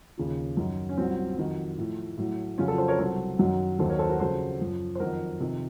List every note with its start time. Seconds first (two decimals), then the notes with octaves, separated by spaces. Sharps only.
0.18 D#2 C#3 F3
0.57 F#2 D#3 F#3
0.89 C#4
0.97 C2 A#2 F#3 C4
1.38 F2 D#3 F#3
1.78 A2 F3
2.18 A2 F#3
2.58 F2 C#3 F#3 C#4 F4
2.68 F4 A4
2.78 A4 C5
2.88 A#4 C#5
2.98 C2 C3 F#3 A4 C5
3.39 F#2 D#3 F#3
3.79 D#2 D#3 F#3 A4 C5
3.89 A#4 C#5
3.99 A4 C5
4.09 F#4 A#4
4.20 F2 C#3 F#3 A4 C5
4.60 F#2 F3
4.95 C5
5.00 F2 D#3 F#3 F#4 A#4
5.40 F2 C3 D#3